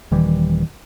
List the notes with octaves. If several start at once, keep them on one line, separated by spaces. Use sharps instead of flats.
D#1 D#3 E3 G3